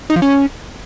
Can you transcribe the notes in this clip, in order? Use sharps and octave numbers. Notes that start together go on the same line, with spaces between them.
D#4
F3
C#4